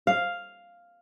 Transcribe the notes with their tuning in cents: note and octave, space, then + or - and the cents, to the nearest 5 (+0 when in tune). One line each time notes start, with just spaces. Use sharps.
F5 +0